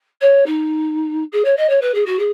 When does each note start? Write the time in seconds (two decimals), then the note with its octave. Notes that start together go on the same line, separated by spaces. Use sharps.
0.21 C#5
0.46 D#4
1.32 G#4
1.44 C#5
1.56 D#5
1.69 C#5
1.81 B4
1.94 G#4
2.05 F#4
2.18 G#4